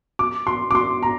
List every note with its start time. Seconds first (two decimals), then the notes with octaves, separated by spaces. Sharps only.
0.19 D6
0.47 C6
0.71 D6
0.75 C6
1.03 A#5